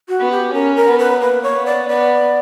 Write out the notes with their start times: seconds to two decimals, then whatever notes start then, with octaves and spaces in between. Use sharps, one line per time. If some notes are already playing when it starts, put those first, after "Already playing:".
0.09 F#4
0.19 B3
0.31 G4
0.53 C#4 A#4
0.76 A#4
0.88 B3
0.99 B4
1.21 A#3 B4
1.43 C#5
1.55 B3
1.66 D5
1.88 B3 D5